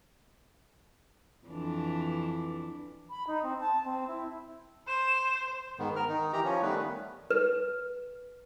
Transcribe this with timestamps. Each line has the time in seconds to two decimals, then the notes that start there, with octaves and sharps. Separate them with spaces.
1.46 F2 E3 D4
3.10 B5
3.27 D#4
3.43 C4
3.60 A5
3.84 C4
4.07 E4
4.88 C5 E7
5.79 G#2 D#3 B3
5.96 A#4 F6
6.09 D#3 D#4
6.33 E3 G4 A#5
6.44 F3 C#4
6.62 D#3 G3 A3 B3 B4
7.31 B4